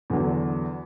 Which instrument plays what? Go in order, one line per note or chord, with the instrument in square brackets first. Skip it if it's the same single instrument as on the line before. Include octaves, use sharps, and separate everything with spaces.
[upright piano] E2 D3 F#3